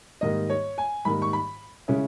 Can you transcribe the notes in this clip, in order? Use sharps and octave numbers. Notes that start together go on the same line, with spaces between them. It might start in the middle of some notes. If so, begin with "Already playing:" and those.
G#2 D#3 G3 A#3 D#5
C#5
G#5
G#2 D#3 G3 A#3 B5
C#6
B5
C#3 G#3 C#4 E4